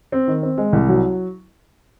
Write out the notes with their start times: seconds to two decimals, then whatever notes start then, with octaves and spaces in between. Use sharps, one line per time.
0.12 C4
0.28 D#3
0.43 C4
0.58 G#3
0.73 C2
0.88 F#3